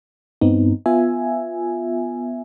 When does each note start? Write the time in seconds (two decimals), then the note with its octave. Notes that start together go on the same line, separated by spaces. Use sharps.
0.41 G2 B3 C4 D#4
0.86 B3 F4 E5 G#5